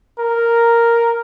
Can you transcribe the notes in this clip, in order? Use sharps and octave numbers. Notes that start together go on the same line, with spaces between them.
A#4